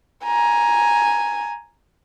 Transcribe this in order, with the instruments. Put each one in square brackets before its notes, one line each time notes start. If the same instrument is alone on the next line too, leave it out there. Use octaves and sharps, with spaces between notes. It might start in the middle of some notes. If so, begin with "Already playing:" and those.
[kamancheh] G#5 A#5